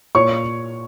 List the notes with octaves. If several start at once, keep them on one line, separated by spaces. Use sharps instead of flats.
A#2 C#5 C#6